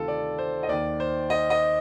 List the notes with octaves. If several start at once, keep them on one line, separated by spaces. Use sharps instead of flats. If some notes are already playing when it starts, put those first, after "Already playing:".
Already playing: D2 C3 D#3 F4 A4
D5
C5
D#5
D#2 D#3 D5
C5
D#5
D#5